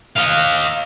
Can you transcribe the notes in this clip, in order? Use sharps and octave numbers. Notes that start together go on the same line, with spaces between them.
D#5 F5